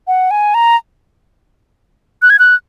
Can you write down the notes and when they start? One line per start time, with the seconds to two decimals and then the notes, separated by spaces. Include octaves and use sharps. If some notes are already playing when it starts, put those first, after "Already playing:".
0.07 F#5
0.31 G#5
0.54 A#5
2.22 F#6
2.30 G#6
2.39 F#6